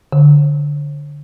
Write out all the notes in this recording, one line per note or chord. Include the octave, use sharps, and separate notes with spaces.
D3